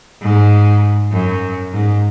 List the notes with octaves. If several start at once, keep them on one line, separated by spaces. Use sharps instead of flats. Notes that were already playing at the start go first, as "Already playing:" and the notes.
G#2
F#2
G#2